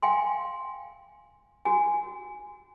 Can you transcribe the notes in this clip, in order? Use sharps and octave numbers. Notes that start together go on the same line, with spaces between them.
F5 G5 G#5 C6
F#4 G#5